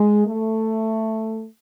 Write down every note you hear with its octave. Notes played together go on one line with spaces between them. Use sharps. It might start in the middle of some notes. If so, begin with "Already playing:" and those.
Already playing: G#3
A3